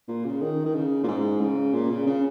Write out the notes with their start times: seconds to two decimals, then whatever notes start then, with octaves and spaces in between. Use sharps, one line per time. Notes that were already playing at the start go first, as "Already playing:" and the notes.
0.08 A#2
0.25 C#3
0.41 D#3
0.65 D#3
0.75 C#3
1.04 A#2
1.08 G#2
1.41 C#3
1.74 A#2
1.90 C#3
2.07 C#3